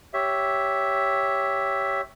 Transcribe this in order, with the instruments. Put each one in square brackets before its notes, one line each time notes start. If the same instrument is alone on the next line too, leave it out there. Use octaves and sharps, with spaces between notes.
[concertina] G4 C#5 E5